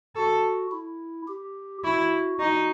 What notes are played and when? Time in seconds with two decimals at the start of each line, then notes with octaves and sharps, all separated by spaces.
0.16 F#4 A4
0.72 E4
1.27 G4
1.84 E4 F#4
2.40 D#4 F#4